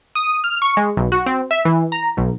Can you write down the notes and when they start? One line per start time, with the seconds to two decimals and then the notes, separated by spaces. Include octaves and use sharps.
0.15 D#6
0.44 F6
0.62 C#6
0.77 G#3
0.97 B1
1.12 F#4
1.26 C4
1.51 E5
1.65 E3
1.92 A#5
2.17 B1